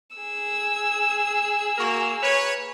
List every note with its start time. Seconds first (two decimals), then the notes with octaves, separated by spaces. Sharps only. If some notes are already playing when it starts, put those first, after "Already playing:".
0.17 G#4 E6
1.78 A#3 F#4 A#4
2.23 B4 C#5